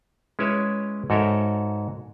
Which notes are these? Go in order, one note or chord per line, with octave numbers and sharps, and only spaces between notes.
G#3 C#4 E4 B4 C#5 E5
G#2 F#4 A4 A#4 C#5 E5